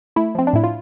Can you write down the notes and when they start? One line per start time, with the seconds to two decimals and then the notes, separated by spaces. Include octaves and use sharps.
0.16 A3 E4
0.35 F3 C4
0.47 D4
0.53 A2 E4
0.64 F4